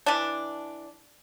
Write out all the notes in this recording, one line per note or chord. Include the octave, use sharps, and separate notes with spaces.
E3 D4